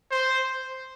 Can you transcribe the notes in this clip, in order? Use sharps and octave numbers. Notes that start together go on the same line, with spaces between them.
C5